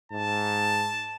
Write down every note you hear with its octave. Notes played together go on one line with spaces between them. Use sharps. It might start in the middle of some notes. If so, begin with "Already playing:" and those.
G#2 A5